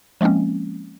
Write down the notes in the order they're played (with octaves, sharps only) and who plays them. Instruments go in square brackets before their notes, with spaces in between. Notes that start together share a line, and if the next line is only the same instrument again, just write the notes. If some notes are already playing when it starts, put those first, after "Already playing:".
[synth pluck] F3 G#3 A#3 C4 C#4